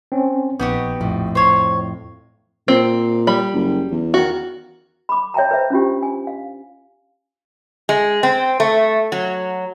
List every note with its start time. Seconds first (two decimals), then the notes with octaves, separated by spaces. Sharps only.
0.12 C4 C#4
0.60 A#1 B3 D#4 F#4 G4
1.01 F2 A2
1.35 C5 C#5
2.68 A#2 C4
3.27 G3 B5
3.54 F#1
3.91 E2
4.14 D#3 F#4
5.09 B5 D6
5.34 C#5 E5 G5 A5 A#5
5.51 B4 C5 E5
5.70 C#4 D4 F4 G4
6.03 G#5
6.27 F5
7.89 G#3
8.23 C4
8.60 A3
9.12 F#3